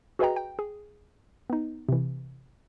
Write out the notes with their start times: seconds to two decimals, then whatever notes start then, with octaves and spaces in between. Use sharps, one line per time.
0.19 F#4 G#4 B4 D#5 G5 A#5
0.36 G5
0.59 G#4
1.50 B3 D#4
1.89 C3 E3